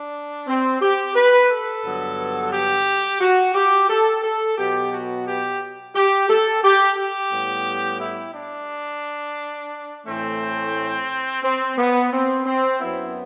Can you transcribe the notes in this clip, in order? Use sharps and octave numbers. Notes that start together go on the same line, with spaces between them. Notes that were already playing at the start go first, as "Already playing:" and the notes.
Already playing: D4
C4
G4
B4
A4
G2 D3 F#3 B3
G4
F#4
G4
A4
A4
B2 F#3 B3 G4
F#4
G4
G4
A4
G4
G4
A2 G3 B3
E4
D4
A2 E3 A3 C4
C4
B3
C4
C4
F#2 F#3 B3 E4